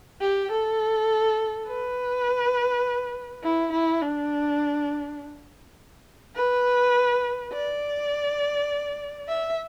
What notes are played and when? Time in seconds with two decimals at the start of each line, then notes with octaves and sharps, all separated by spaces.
0.21 G4
0.51 A4
1.67 B4
3.43 E4
3.72 E4
4.02 D4
6.36 B4
7.52 D5
9.28 E5